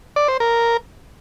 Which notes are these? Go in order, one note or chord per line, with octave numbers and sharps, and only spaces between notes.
D5
C5
A#4